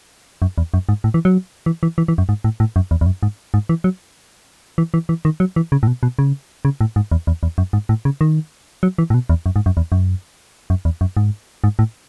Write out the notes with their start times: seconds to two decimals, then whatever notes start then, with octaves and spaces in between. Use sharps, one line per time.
0.42 F#2
0.58 E2
0.74 F#2
0.89 G#2
1.04 A2
1.14 E3
1.25 F#3
1.66 E3
1.83 E3
1.98 E3
2.08 E3
2.18 F#2
2.29 G#2
2.44 A2
2.60 A2
2.76 F#2
2.91 E2
3.01 E2
3.06 F#2
3.23 G#2
3.54 G#2
3.69 E3
3.84 F#3
4.78 E3
4.94 E3
5.09 E3
5.25 D#3
5.40 F#3
5.56 E3
5.72 C#3
5.83 A2
5.87 B2
6.03 B2
6.19 C#3
6.65 C#3
6.81 A2
6.96 G#2
7.12 E2
7.27 E2
7.43 E2
7.58 F#2
7.73 G#2
7.89 A2
8.05 C#3
8.21 D#3
8.83 F#3
8.98 E3
9.10 A2
9.14 B2
9.29 E2
9.46 F#2
9.56 G#2
9.66 F#2
9.77 E2
9.92 F#2
10.70 F#2
10.85 E2
11.01 F#2
11.17 G#2
11.64 G#2
11.79 A2